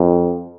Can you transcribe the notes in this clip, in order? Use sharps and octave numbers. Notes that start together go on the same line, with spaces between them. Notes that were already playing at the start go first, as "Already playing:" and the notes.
Already playing: F2